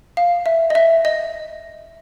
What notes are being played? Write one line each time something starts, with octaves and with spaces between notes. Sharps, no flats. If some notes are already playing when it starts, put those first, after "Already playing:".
F5
E5
D#5
E5
D#5